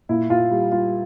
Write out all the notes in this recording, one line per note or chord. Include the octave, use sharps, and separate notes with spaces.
A#2 E4
A#2 F4
G3
G3 F4